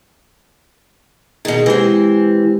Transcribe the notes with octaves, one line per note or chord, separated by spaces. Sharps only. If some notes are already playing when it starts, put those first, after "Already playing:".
B2 D#3 G#4
E3 G#3 C4 E4 G4